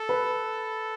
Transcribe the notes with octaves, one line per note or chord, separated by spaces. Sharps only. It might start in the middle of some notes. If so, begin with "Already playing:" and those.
Already playing: A4
B4